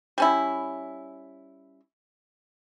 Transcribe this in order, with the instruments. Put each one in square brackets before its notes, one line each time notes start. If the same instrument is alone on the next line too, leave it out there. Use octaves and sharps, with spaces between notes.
[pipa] G3 C#4 E4